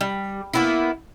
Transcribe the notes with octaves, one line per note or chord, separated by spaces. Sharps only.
G3
A#3 B3 E4